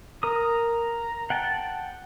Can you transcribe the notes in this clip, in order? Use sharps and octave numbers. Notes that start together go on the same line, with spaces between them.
A#4 A#5 D#6
F#5 G5 A5